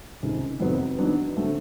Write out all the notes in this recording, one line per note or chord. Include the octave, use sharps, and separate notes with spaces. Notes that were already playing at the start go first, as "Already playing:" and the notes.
C#2 C3 D#3
F2 C3 D#3 F#3 B3
D#3 F#3 B3 D4
D3 F#3 A3 C4